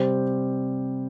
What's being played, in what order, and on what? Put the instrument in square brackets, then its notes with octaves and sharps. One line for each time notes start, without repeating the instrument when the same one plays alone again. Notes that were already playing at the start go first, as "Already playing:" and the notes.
Already playing: [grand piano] C3 G3 C4 G4